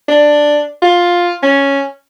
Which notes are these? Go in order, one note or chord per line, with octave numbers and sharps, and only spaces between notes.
D4
F4
C#4